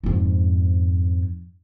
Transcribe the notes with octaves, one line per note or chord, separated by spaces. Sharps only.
F2 G#2